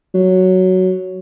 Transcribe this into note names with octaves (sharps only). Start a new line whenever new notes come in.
F#3